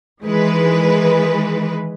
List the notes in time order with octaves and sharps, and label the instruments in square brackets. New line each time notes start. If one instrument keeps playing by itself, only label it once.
[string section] D#3 E3 G#3 B4